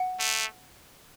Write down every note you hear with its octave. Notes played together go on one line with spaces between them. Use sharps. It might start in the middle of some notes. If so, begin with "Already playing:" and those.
Already playing: F#5
A3